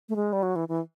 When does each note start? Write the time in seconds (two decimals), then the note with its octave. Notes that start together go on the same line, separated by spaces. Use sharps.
0.09 A3
0.16 G#3
0.33 G3
0.43 F#3
0.56 E3
0.69 E3